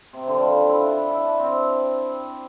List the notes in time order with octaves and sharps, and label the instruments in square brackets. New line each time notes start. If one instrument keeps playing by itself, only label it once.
[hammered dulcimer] C3
D3
F3
G3
F4
E4
D4
E4
E4
D4
C4